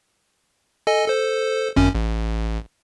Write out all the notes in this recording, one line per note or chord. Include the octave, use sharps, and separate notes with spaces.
A4 D#5 G#5
A4 C5
G#1 F#2 C#4
A1